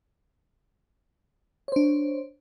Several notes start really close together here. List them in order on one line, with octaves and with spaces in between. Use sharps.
C#5 C5 D4